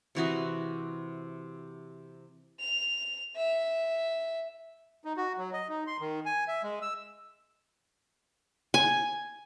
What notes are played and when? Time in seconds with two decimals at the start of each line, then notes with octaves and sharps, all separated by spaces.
0.15 C3 E3 F#4 D#5
2.60 F7
3.37 E5
5.05 D#4
5.17 F#4
5.38 F#3
5.53 D#5
5.69 D#4
5.87 C6
6.01 D#3
6.26 G#5
6.48 E5
6.63 G#3
6.82 E6
8.74 G#5